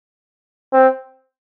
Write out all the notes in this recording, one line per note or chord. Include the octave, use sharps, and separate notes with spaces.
C4